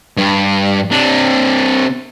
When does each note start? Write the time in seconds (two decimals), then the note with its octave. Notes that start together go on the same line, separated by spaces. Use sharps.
0.17 G2
0.91 C3 D4